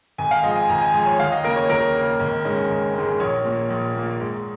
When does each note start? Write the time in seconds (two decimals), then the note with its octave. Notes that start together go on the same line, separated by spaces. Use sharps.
0.18 G#1 G#5
0.31 F5
0.43 G#2 F3 D#5
0.56 G#5
0.69 G#1 A#5
0.81 G#5
0.93 G#2 F3 G#5
1.06 C#5
1.19 D#2 F5
1.32 D#5
1.44 C#3 A#3 A#4
1.56 C#5
1.69 D#2 A#4
1.94 C#3 A#3
2.19 G#1
2.45 G#2 D#3 G#3 C#4
2.70 G#1
2.95 G#2 D#3 G#3 C#4
3.19 A#1 C#5
3.45 A#2 A#3
3.70 A#1
3.95 A#2 A#3
4.20 G#2